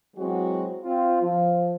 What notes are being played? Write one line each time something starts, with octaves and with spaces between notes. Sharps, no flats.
E3 F#3 G#3 C4 F#4
C4 F4
F3